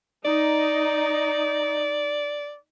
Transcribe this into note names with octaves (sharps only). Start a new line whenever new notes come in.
D#4 D5